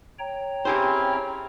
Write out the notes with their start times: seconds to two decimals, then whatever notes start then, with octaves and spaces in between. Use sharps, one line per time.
0.19 C#5 G5 A#5
0.65 C4 C#4 E4 G4 G#4 C5